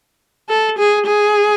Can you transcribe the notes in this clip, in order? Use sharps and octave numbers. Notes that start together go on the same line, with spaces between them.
A4
G#4
G#4